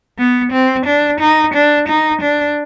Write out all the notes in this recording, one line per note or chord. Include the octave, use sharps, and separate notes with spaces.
B3
C4
D4
D#4
D4
D#4
D4